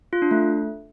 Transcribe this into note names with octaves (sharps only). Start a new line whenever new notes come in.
F4
D4
A3